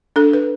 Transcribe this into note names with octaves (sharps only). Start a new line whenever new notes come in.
D4 A4
B4